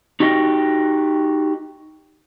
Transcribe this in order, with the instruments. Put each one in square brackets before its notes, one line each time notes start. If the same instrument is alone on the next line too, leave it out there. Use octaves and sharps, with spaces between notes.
[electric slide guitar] D#4 F#4 G4 D#5